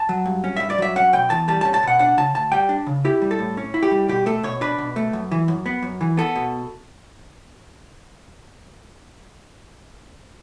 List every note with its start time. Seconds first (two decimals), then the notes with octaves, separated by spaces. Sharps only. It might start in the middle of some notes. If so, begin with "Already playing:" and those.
Already playing: A5
0.09 F#3
0.26 G2
0.44 C#4
0.56 G2 E5
0.70 D5
0.78 F#3 E5
0.96 C#4 F#5
1.13 B2 G5
1.30 E2 A5
1.48 G3 A5
1.61 A5
1.65 C#4
1.74 A5
1.83 B2 F#5
1.99 D4 F#5
2.17 C#3 A5
2.35 D2 A5
2.52 G3 G5
2.69 D4
2.87 C#3
3.05 E4 G4
3.22 G3
3.31 A4
3.39 A2
3.57 C#4
3.74 E4
3.83 G4
3.91 G3
4.08 B2 G4
4.26 A3 A4
4.43 B2 C#5
4.61 D4 B4
4.78 B2
4.96 A3
5.13 F#2
5.31 E3
5.48 F#2
5.66 B3
5.83 F#2
6.01 E3
6.17 B3 A4
6.35 B2